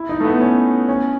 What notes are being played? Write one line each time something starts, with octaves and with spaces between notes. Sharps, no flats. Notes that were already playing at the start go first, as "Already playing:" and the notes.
Already playing: E4
D#4
A3
B3
C#4
C#4